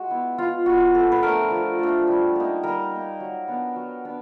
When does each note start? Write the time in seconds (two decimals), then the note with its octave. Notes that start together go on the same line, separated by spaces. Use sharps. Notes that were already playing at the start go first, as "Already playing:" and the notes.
Already playing: G#3 F#4
0.11 B3 E4
0.38 G#3 F4
0.66 B3 E4 F#4
0.95 F3 A4
1.12 B4
1.23 A3 D4 A#4
1.51 F3
1.79 A3 D4
2.07 G3
2.36 A#3 D#4
2.63 G3 A#4
2.91 A#3 D#4
3.20 F#3
3.48 B3 D4
3.76 F#3
4.05 B3 D4